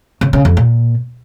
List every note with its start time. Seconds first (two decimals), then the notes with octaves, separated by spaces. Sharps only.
0.21 C#3
0.33 C#3
0.45 F2
0.57 A#2